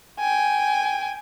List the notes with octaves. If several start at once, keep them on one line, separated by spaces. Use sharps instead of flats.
G5 G#5